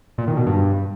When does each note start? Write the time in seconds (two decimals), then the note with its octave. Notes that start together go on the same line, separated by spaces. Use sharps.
0.18 A#2
0.27 D#3
0.37 B2
0.46 G2